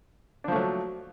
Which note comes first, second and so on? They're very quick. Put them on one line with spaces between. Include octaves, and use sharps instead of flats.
D4 F3 A3 F#3